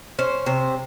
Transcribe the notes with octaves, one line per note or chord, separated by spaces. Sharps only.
C#4 C5
C3 C5